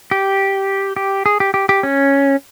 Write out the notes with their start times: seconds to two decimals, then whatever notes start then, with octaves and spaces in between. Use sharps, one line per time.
0.11 G4
0.96 G4
1.26 G#4
1.40 G4
1.54 G4
1.69 G4
1.83 C#4